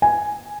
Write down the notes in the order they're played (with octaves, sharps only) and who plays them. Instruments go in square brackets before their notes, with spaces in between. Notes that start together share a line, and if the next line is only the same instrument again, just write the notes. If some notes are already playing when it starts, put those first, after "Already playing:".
[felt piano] G#5